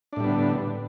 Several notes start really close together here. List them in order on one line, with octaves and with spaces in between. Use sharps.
D4 A2 G3 B3 D3